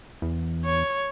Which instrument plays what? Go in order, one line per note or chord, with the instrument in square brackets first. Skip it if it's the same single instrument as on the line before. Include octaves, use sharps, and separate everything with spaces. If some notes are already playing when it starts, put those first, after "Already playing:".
[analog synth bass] E2
[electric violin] C#5